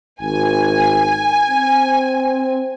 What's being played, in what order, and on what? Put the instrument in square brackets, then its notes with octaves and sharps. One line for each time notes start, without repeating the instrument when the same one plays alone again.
[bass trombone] G#1 [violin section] G#5
[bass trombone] C4